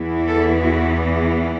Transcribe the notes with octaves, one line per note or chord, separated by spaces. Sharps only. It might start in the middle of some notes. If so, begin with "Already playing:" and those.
Already playing: E2 E3 B3 E4
A4
F#4